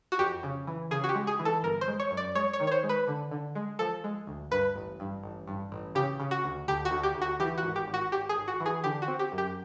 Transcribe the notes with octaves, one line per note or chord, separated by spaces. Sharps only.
F#4
F2 G4
C#3
E3
C#3 G#4
F#4
G4
G#3
G#4
E3
A4
G1 A#4
C5
G#3
C#5
F#2
D5
G#3 C#5
C#5
D#3
C#5
C5
G#3
B4
D3
D3
G#3
F3 A4
G#3
D2
G2 B4
A1
G2
A1
G2
A1
C#3 G4
C#3
F#4
D2
D2 G4
F#4
D2
G4
D2
F#4
E3 G4
F#4
G#1
G4
G#1
F#4
G#1 G4
G#4
G#1
F#4
E3
G#4
D3 G4
F#4
C4
G4
F#2
G4